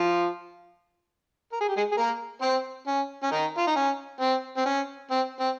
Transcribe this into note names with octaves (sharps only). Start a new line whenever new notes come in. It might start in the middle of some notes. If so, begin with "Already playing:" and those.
Already playing: F3 F4
A#4
G#4
G4
G#3 G#4
G#4
A#3 A#4
C4 C5
C#4
C#4
D#3 D#4
F4
D#4
C#4
C4
C4
C#4
C4
C4